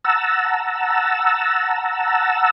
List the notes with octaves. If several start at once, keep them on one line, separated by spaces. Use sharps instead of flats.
F#5 A5 A#5 E6